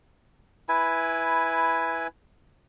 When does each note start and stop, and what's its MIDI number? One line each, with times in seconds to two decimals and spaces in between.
0.69 2.07 64
0.69 2.07 71
0.69 2.07 80